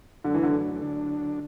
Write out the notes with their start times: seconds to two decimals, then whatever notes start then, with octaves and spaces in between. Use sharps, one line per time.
0.24 F#2 D3 F#3 A3 D4
0.34 E3
0.43 D3
0.82 D2 D3 F#3 D4